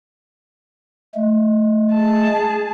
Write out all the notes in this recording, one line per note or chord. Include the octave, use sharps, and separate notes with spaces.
G#3 A3
G#4 A5